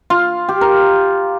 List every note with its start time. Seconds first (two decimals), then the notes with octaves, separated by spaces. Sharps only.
0.10 F4
0.49 G4
0.61 A#4